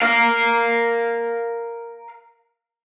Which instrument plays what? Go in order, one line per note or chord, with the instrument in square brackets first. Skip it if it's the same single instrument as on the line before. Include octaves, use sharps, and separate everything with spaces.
[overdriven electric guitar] A#4 F5